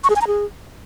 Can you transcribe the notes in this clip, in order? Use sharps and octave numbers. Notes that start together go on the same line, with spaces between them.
C#6
G#4
G#5
A#5
G#4